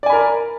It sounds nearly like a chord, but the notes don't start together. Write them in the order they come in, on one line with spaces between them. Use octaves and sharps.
D5 G#5 B5 A#4